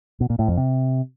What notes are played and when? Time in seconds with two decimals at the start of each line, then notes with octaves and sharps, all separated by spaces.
0.21 B2
0.30 A#2
0.39 A2
0.48 F2
0.57 C3